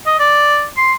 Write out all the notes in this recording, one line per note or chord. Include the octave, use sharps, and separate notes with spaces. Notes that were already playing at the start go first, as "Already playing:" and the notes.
D#5
D5
C6